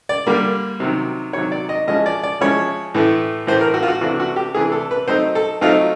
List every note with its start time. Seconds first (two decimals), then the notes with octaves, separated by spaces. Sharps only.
0.09 D5
0.26 D3 G3 A#3
0.80 C3 D#3 F#3
1.33 C3 D#3 F#3 C#5
1.52 D5
1.69 D#5
1.87 F3 G#3 C#4 E4 D#5
2.06 D5
2.23 D5
2.41 F3 G#3 C#4 E4 C#5
2.95 A2 E3 A3
3.47 A2 E3 A3 C5
3.61 A#4
3.74 F#4
3.83 F4
3.88 F#4
4.01 C3 E3 A3 D4 F#4
4.20 F#4
4.36 G4
4.54 C3 E3 A3 D4 G#4
4.72 A4
4.91 B4
5.08 F#3 A3 C4 D#4 C5
5.35 A4
5.61 F#3 A3 C4 D#4 F4